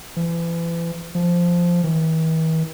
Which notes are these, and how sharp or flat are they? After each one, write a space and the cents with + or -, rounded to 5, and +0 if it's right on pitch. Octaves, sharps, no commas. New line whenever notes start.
E3 +35
F3 -5
E3 -45